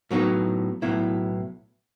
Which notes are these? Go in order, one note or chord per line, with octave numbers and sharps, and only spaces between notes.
A2 F#3 B3 D#4
B1 A2 F#3 B3 E4